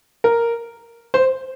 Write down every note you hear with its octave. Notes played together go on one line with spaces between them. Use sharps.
A#4
C5